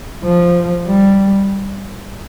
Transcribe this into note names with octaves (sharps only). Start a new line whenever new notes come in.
F3
G3